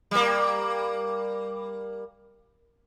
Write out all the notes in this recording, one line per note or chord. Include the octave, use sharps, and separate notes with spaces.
G3 A#3